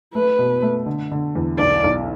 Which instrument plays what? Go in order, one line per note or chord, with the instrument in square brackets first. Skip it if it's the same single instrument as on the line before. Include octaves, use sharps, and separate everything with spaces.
[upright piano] A3 [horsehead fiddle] B4
[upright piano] B2
A3
D3
D3
E2
[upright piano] B1 [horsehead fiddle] D5
[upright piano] B1